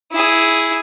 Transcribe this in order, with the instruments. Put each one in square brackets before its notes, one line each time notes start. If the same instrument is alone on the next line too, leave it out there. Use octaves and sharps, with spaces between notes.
[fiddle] E4 G#4